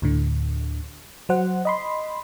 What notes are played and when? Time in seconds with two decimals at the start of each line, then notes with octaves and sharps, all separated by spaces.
0.02 D2 A2 D3
1.29 F#3 C5 F#5
1.65 D#5 B5 C6